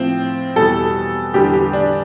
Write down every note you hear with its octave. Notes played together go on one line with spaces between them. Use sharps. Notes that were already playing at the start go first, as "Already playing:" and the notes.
Already playing: A2 F3 C4
E2 B2 G3 A4
E2 D3 G3 G4
G4
D4